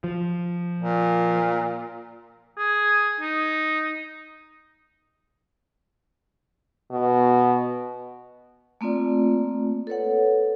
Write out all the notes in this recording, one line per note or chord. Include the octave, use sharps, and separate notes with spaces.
F3
A#2
G#4
D#4
B2
A3 A#3 C4 F4 D5
A4 B4 C#5 F#5